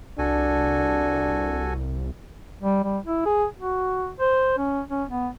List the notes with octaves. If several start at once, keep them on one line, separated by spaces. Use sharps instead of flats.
C2 D4 F#4 A4 G#5
G3
G3
E4
G#4
F#4
C5
C#4
C#4
B3